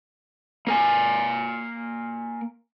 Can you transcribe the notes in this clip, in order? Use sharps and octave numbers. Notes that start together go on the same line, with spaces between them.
A#3 A#4 G#5